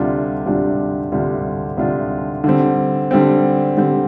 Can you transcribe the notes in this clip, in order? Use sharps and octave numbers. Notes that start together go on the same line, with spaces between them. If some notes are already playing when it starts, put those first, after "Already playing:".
Already playing: D2 C3 G3 D4 F4
D2 C3 G3 D4 F4
D2 C3 G3 D4 F4
D2 C3 G3 D4 F4
D3 G3 C4
D3 G3 C4
D3 G3 C4